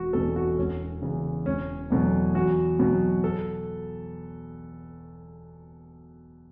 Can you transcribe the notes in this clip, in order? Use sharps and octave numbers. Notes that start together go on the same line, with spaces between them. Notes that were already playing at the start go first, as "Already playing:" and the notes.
Already playing: E1 F#4
E2 B2 A4
F#4
E1 C#4
E2 C#3
E1 C#4
E2 B2 F#3 A3
E2 F#4
B2 F#3
A4